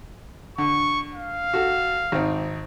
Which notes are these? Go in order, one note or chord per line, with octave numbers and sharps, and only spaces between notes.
D3 C#6
F5
F#4 A4
G#1 C4 D#4